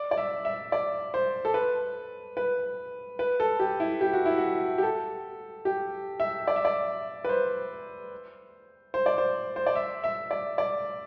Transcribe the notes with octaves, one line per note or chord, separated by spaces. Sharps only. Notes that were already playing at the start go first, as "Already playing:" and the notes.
Already playing: D5
D5
E5
E5
D5
C5
A4
B4
B4
B4
A4
G4
E4
G4
F#4
E4
F#4
G4
A4
G4
E5
D5
E5
D5
B4
C5
C5
D5
C5
C5
D5
E5
E5
D5
D5